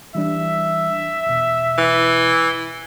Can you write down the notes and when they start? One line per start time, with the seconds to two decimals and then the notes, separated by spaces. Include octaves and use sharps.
0.15 E3 G3 D4 E5
1.26 E2 B2
1.78 E3